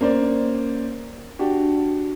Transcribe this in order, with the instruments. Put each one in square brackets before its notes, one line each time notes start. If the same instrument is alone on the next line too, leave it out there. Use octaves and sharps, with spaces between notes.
[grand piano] A#3 C#4 C5 D5
D4 F#4 G4